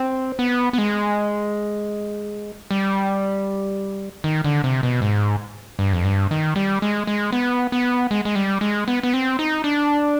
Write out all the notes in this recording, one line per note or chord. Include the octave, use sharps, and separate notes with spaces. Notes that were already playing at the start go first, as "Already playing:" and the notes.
Already playing: C4
B3
B3
G#3
G3
D#3
D3
C3
B2
G#2
G2
F2
G2
D#3
G3
G#3
G#3
B3
B3
G#3
G#3
G3
G#3
B3
B3
C4
D#4
D4